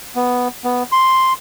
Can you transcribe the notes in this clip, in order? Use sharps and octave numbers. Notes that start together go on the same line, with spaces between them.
B3
B3
C6